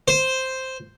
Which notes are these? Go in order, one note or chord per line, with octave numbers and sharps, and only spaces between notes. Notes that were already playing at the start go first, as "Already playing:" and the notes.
C5